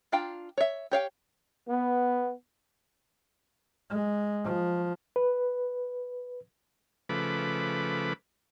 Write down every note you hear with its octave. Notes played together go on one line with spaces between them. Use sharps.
D4 F4 F5 G5 A#5
C#5 E5
G4 C#5 F5 G5
B3
G#3
F3
B4
C#3 F3 A3 B4 B5 D6